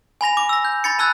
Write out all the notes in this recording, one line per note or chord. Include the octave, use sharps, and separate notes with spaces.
G#5 B5 A#6 F7
D6
E6 A#6
G6
B5 A6 C#7
A5 B5 E6 F#6 G#6 A6